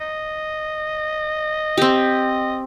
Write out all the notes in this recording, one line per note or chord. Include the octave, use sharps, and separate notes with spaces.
D#5
C4 G4